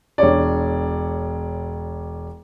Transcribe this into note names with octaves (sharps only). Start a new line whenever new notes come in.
E1 D4 C#5 D5